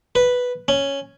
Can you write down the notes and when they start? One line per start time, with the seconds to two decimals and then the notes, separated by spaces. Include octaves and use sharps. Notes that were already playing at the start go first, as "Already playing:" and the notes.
0.15 B4
0.68 C#4